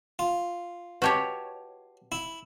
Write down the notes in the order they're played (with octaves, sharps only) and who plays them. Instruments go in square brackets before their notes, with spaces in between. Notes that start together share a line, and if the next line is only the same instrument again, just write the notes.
[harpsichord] F4
[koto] F#4 G4 C#5 [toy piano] B4 D#5 A5
[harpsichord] E4